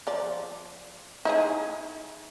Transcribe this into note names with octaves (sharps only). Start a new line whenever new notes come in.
F3 D5
D#4 E4 G#4